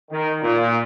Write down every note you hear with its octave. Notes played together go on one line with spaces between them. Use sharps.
D#3
A#2